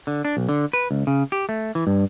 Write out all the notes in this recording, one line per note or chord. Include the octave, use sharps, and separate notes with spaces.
D3
D4
B1
D3
B4
C#2
C#3
G4
A3
E3
G2